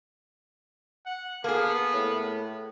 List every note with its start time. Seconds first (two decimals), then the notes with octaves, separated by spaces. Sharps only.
1.06 F#5
1.44 A#3 B3 G#4 A4
1.94 A2